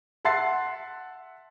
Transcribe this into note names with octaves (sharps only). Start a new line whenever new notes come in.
E5 F#5 A5 C6 A6 C7